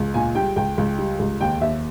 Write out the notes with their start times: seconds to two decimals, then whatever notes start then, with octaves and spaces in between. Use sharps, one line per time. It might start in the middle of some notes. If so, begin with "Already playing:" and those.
Already playing: C#2
0.14 A#2 G#5
0.35 G3 G5
0.56 C#2 G5
0.78 C#2
0.98 G3
1.19 C#2
1.41 D#2 G5
1.61 D#2 E5